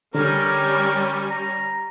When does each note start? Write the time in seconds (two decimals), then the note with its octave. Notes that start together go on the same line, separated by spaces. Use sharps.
0.15 D3 G3 C#4 A#4
1.31 A#5